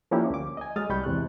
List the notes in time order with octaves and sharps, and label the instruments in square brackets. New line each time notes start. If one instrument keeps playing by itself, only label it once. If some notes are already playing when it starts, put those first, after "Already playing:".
[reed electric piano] F3 A#3 C#4 D4 E4 G4
D2 D6
D#5 G#5
F#3 G#3 D#6 F6 A6
C2 G3 B5 C#6 G6
E2 C3 G#3 F#6